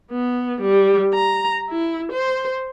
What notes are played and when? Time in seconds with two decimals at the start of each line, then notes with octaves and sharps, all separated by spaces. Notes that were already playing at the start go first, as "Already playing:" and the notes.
0.11 B3
0.61 G3
1.14 A#5
1.70 E4
2.12 C5